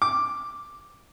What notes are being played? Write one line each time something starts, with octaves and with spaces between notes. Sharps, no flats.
D6